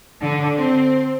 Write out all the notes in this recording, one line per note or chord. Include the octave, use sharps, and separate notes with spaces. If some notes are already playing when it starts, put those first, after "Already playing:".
D3
C4